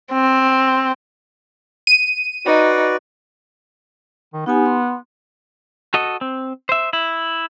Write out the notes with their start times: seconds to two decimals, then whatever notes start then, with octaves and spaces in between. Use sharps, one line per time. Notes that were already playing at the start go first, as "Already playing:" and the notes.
0.12 C4
1.87 D#7
2.46 D#4 F#4 B4 D5
4.34 D#3
4.46 B3 D#4 G4 G#5
4.66 C6
5.94 F#4 A4 D#5
6.21 C4
6.69 C5 E5
6.93 E4